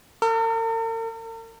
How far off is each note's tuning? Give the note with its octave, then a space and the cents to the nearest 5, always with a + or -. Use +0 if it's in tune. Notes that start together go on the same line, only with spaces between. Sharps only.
A#4 -45